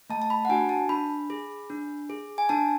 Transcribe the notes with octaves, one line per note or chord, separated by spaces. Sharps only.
A3 A5
A5
B5
F#5
D4 F#4 G#5
A5
D4 B5
G#4
D4
G#4
G#5
D4 A5